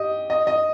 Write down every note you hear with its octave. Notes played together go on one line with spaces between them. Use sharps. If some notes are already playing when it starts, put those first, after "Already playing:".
Already playing: G4 D#5
D#5
D#5